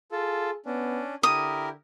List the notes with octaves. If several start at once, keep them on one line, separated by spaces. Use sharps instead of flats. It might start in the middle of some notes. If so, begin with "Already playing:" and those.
F4 G#4 A4
B3 C#4 D4
D3 E4 G4 A#4 D#6